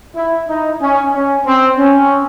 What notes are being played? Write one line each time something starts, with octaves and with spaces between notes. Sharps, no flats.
E4
D#4
C#4
C#4
C4
C#4